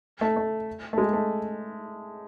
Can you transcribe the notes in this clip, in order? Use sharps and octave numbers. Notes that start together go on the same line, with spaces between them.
A3
A3
A3
G#3
A3